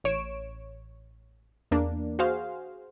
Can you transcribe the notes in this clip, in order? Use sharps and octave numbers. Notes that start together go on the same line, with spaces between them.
A1 C#5 D7 E7
E2 A#3 D4
F#4 G#4 C5 F5